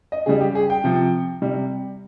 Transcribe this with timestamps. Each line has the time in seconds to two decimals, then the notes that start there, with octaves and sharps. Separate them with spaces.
0.12 D#5
0.26 C#3 G3 G#4
0.41 G4
0.55 G#4
0.70 G5
0.84 C3 F3
1.42 C3 G3